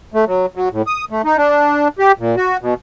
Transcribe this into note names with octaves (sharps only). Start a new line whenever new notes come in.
A3
F#3
F#3
A2
D#6
A3
D#4
D4
G4
A#2
F#4
B2